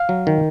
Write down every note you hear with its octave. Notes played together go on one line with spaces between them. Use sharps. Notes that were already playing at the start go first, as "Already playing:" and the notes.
Already playing: F5
F#3
D#3